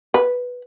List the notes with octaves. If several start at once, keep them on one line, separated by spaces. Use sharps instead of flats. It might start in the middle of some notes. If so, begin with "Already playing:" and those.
B4